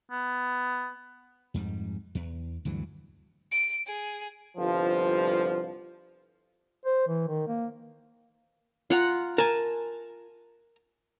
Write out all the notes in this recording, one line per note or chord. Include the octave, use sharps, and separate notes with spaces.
B3
F2 G#2 G3
E2
D2 G2 E3 F#3
D7
G#4
G1 C2 F3
C5
E3
D#3
A#3
F4 F#5 A#5
A#4 G#5 A5